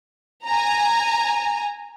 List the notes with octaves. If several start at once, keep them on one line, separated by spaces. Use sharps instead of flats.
G#5 A#5